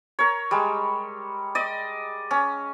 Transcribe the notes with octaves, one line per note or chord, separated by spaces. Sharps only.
A#4 C#5
G3 G#3
D5 D#5
C#4